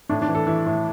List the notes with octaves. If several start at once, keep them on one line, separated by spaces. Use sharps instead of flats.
A2 D4
D4
E3
A4
E3 E4
A2